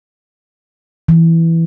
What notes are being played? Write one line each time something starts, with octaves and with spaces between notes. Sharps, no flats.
E3